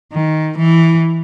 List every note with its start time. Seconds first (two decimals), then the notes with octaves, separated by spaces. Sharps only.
0.13 D#3
0.58 E3